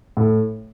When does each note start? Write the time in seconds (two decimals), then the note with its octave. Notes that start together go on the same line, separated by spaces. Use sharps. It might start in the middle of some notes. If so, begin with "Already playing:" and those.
0.17 A2